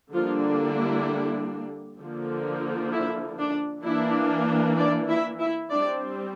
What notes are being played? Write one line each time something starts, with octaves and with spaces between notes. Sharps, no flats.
D3 F3 G3 A#3 D4 F4
E4
D3 F3 A#3
E4
D4
E3 A#3 D4 E4
D4 D5
E4 E5
E4 E5
G3 C4 D4 D5